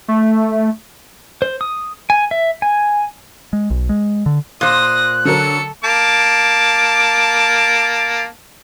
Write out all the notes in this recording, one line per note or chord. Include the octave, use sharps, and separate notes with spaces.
A3
C5
D#6
G#5
E5
G#5
G#3
B1
G#3
D3
A#2 C5 C6 D#6 F#6 A#6
D3 F#3 A4 A#4 C#7
A#3 A5 D6